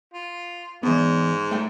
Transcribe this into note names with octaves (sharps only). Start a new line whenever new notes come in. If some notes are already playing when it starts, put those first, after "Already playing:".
F4
G#2 E3 B3
A3 G5